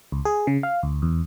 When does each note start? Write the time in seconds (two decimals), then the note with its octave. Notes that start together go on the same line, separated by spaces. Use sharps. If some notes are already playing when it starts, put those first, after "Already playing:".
0.12 C#2
0.25 G#4
0.47 C#3
0.63 F5
0.83 D2
1.02 E2